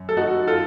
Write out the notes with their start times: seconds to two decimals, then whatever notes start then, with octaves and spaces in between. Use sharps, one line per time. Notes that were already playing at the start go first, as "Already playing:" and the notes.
Already playing: F#2
0.09 A4
0.17 D#4 F#4
0.48 F4 A4